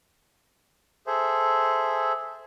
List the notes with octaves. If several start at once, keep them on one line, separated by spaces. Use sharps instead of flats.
G#4 A4 C5 E5